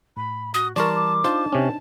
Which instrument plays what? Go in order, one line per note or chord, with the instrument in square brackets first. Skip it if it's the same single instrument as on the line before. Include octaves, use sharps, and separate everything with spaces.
[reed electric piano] A2 [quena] B5
[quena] F#4 [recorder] D#6
[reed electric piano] E3 G3 C6 [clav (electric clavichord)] A#4 D5 [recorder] A5 [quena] C#6
[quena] D6
[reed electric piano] D4 D#4 [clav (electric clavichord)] F4 C5 [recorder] A5
[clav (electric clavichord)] C3 C#4